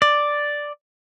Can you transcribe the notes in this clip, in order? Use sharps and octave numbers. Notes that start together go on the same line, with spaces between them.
D5